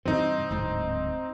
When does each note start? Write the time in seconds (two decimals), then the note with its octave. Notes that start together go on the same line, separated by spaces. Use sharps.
0.05 G2 C3 E3 C4 D#4
0.50 D1 D2 G#2